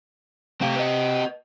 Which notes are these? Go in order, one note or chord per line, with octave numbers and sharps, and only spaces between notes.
A3 C4 G4 F5
B4 D#5